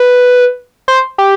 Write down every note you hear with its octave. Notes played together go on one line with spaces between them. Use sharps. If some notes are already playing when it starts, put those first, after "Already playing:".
Already playing: B4
C5
G4